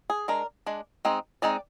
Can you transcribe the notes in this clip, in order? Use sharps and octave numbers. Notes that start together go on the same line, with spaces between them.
G#4
G#3 D4 A#4
G#3 D4
G#3 C4 D#4
G#3 C4 D#4 D5